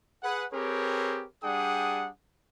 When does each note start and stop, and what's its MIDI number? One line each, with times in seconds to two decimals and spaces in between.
0.23 0.45 68
0.23 0.45 71
0.23 0.45 78
0.52 1.25 60
0.52 1.25 67
0.52 1.25 68
0.52 1.25 70
0.52 1.25 71
0.52 1.25 73
1.43 2.09 55
1.43 2.09 62
1.43 2.09 68
1.43 2.09 78
1.43 2.09 79
1.43 2.09 87